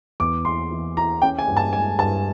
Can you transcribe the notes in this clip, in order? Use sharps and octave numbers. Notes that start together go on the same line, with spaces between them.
E2 D6
E2 C6
E3
E3 A#5
C#4 G5
G#5
G2
A5
G#3 G#5
G2 A5